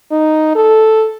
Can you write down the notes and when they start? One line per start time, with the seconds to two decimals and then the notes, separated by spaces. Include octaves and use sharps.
0.11 D#4
0.55 A4